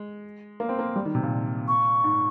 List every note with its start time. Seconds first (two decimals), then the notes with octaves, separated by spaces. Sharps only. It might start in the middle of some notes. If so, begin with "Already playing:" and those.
Already playing: G#3
0.60 A#3
0.69 C4
0.79 A#3
0.96 G3
1.05 D#3
1.15 C3
1.23 A#2
1.68 C#6
2.04 G#2